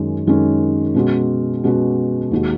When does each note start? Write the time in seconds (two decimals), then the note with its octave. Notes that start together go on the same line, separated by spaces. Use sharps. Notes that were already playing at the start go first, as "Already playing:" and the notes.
Already playing: F#2 D#3 G#3 C#4
0.27 F#2 D#3 G#3 C#4
0.95 B2 G#3 C#4 F#4
1.64 B2 G#3 C#4 F#4
2.31 D#2 D#3 G#3 D#4 F#4